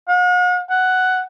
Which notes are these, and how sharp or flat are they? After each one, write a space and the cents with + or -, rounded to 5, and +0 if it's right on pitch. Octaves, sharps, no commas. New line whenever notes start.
F#5 -45
F#5 +5